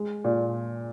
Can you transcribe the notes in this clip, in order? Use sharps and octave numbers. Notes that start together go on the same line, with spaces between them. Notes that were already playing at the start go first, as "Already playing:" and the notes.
Already playing: G#3
A#2